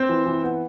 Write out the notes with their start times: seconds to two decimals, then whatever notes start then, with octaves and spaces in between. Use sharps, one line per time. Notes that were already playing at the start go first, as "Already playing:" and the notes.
Already playing: C4 C5
0.09 E3
0.26 E3
0.43 B3